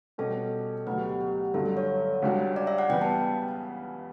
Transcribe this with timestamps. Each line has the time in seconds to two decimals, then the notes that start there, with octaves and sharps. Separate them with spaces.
0.18 B2 G3 C#4 G4 A4
0.86 D2 C#3 F#3 B3 B4
0.97 G4
1.09 G4
1.21 G4
1.54 G2 D3 F#3 A4
1.66 A4
1.77 C#5
2.22 C#2 C#3 G3 D4 F#4
2.56 D5
2.67 E5
2.78 F#5
2.89 C#3 E3 G3 B3 G5
3.02 A5